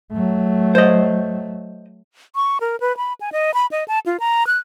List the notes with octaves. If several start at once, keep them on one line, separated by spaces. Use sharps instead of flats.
F#3 A3
C5 D#5
C#6
A#4
B4
B5
G#5
D#5
B5
D#5
A5
F4
A#5
F#6